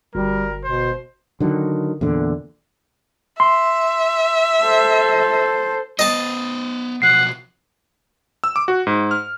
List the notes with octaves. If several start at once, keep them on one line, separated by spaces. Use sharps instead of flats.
G1 G3 A#4
B2 C5
D3 D#3 F#3
E2 A#2 D3
E5 C6
A4 C5
B3 C5 D#5 A5
B2 F3 F#3 F#5 C7
E6
D6
F#4
G#2
F6